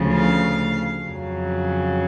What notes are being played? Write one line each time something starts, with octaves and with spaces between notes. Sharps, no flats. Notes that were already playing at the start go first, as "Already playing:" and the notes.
Already playing: D2 C#3 F3 A3
F5
F2 C#3 F#3